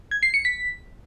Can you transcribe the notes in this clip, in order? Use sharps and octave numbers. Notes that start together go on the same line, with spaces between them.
G#6
C7
C#7
B6